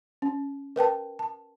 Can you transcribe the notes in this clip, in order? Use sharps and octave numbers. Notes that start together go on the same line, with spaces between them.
C#4
A#4 B4 G5 A5
A5